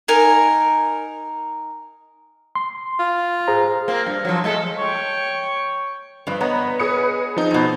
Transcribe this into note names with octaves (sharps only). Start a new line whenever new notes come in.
D#4 A#4 G#5
C6
F4
G#4 C5 A#5
A#3 C4
G2
F3 F#3
G#3 A3 A4
C#5 G5
G2 F3 B4
B3 C#5 D#5 A#5 B5
G#4 D#6 C#7
F3 C4 D#4
F2 B2